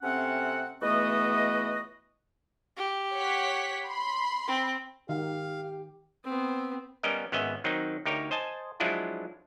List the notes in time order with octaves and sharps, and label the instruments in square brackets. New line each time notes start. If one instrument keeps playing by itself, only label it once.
[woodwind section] C3 A3 C4 C#4 F#5
C#2 E3 A3 B3 F#4 D#5
[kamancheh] G4
[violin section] C#5 F#5 B6
B5 C6
[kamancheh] C4
[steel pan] D#3 [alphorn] G4 [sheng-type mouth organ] F5
[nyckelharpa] B3 C4
[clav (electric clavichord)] G3 B3 C#4 A#4 D#5
G#1 B3 C#4 D#5 E5
D#3 F#3 C4 D#4
D2 D#4 G4 A#4 C#5
C5 D#5 G#5 A5
F3 F#3 G#3 D4 E4 F4